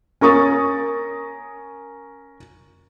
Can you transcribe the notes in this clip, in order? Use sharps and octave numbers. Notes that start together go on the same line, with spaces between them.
C#4 A#4 C#6 D#6 A6